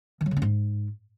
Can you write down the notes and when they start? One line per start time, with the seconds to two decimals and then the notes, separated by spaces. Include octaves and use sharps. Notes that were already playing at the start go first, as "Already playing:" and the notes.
0.21 D#3
0.26 F#3
0.31 C#3
0.37 C#4
0.42 G#2